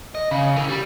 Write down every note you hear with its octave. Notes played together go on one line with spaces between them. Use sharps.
D#5
C#3
E3 A#4
G3